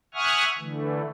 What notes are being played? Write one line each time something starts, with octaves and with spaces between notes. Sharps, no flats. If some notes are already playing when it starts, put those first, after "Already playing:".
E5 F#5 G#5 C#6 D#6 F6
D3 E3 A3